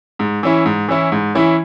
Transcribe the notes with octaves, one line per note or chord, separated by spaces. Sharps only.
G#2
E3 C#4 E4
G#2
E3 C#4 E4
G#2
E3 C#4 E4